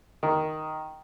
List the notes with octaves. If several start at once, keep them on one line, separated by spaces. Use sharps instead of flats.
D#3